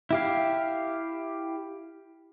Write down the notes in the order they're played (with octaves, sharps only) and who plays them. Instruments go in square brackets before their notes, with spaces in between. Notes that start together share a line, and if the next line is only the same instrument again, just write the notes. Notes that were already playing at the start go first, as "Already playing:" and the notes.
[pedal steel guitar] E4 G4 F5